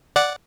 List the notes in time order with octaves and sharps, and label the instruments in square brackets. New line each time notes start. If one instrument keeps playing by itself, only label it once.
[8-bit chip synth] D5 F#5